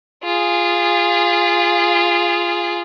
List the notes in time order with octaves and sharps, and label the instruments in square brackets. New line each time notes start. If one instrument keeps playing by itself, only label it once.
[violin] F4 G#4